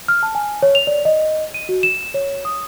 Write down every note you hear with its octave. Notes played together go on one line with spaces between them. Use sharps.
F6
A5
G#5
C#5
F7
D5
D#5
D#7
F#4
E7
C#5
D#6